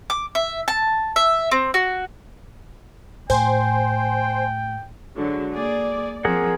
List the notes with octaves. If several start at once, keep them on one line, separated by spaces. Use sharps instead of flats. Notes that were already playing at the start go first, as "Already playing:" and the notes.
D6
E5
A5
E5
C4
F#4
A2 C5 G5 G#5
D3 F#3 G#3
A#3 G#4 D5
F3 C4 G#4 A#4 F#5